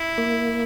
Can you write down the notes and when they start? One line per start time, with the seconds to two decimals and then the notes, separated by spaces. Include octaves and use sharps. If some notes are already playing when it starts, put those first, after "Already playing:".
Already playing: E4
0.18 A#3